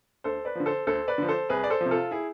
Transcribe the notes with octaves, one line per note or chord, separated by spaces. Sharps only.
D2 A4 C5
B4 D5
D3 F3
A4 C5
D2 A4 C5
B4 D5
D3 F3
A4 C5
C2 G#4 B4
D5
A4 C5
C3 F3
F4 A4
E4 G#4